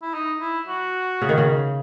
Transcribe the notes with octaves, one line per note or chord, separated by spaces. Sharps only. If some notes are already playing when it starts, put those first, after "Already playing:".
E4
D#4
E4
F#4
C#3
D#3
C#3